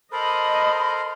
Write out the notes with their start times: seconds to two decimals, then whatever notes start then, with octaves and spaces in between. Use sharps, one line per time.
0.12 A4 A#4 C5 D#5 B5